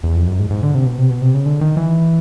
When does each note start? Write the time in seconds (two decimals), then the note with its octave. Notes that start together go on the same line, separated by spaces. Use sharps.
0.04 E2
0.16 F2
0.28 F#2
0.39 G#2
0.51 G#2
0.63 D3
0.75 C3
0.86 B2
0.98 C3
1.10 B2
1.22 C3
1.34 C#3
1.46 D3
1.61 D#3
1.77 E3